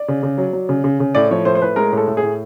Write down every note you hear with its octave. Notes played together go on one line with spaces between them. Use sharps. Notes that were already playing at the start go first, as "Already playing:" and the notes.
Already playing: D5
C#3
C#3
F#3
F#3
C#3
C#3
C#3
A2 D5
F3 C#5
A2 C5
C5
A2 B4
G#3 A#4
A2
A4
A2
G#4
A2